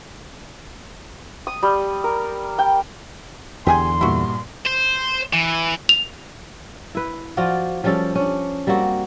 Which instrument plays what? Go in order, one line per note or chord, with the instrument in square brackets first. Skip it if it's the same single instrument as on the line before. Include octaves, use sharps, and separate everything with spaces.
[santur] D#6
G3
A#4
G5
[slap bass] E2 D3 [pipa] G4 G#4 G#5 [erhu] C6
[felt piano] G2 A#2 [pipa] E4 F#4
[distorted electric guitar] C5
E3
[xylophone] F7
[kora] E4 B4
F3 F4 F#4 D5
F3 G3 C#4 A4
C#4 D4
G3 A#3 C4 F#4